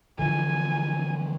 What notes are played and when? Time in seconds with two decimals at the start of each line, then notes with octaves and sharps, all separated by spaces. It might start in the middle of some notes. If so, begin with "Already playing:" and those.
0.19 D3 E3 F3 G#5